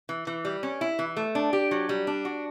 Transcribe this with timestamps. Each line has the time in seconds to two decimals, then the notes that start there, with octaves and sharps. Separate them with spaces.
0.09 E3
0.27 E3
0.45 G3
0.63 C#4
0.81 E4
0.99 E3
1.17 A3
1.35 D4
1.53 G4
1.71 F#3
1.89 G3
2.07 D4
2.25 F#4